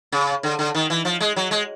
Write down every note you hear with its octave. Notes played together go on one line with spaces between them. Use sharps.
C#3
D3
D3
D#3
E3
F3
G#3
F#3
G#3